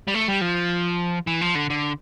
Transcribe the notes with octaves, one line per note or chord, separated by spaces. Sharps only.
G3
A3
G3
F3
E3
F3
D3
D3